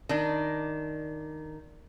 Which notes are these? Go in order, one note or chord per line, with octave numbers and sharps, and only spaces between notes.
D#3 D4